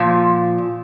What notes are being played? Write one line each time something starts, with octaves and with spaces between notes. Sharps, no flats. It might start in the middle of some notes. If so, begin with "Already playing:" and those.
Already playing: A#2 F3